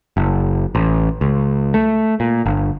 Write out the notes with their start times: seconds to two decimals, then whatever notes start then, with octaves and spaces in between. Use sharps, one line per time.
0.17 F#1
0.75 A1
1.21 C#2
1.74 A3
2.20 A#2
2.46 G1